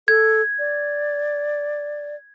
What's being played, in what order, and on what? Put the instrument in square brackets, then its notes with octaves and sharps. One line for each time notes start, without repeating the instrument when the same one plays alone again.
[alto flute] A4 [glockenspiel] G#6
[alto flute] D5